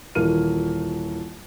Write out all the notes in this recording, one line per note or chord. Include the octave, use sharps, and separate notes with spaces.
D#1 E3 A#3 F4 F6 D#7